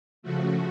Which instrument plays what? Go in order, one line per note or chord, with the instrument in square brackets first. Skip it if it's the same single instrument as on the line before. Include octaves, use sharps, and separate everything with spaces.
[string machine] C#3 F3 A3 F#4